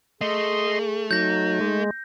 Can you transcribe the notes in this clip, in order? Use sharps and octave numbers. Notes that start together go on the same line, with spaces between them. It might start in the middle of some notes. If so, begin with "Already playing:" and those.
A3 G#4 D#5 C6
F#3 D#4 G6 A#6
G#3